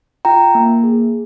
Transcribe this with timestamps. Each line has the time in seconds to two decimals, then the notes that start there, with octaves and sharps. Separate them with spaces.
0.25 F4 G5 A#5
0.55 A#3
0.84 G#4